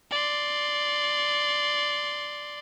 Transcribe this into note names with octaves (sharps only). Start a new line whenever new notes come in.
D5 C6